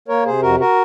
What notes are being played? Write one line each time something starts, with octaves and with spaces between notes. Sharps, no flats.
A#3 A#4 C#5
C3 G#4 C5
F2 F#4 A#4
F#4 A#4